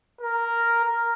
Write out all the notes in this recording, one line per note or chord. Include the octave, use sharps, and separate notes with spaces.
A#4
A#4